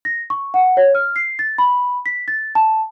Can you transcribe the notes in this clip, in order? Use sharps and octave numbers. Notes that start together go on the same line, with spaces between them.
A#6
C#6
F#5
C#5
F6
C7
A6
B5
B6
A6
A5